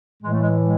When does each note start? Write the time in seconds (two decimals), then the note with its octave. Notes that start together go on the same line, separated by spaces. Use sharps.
0.22 A2 E3 G#3
0.31 A3
0.42 G#3
0.62 G#3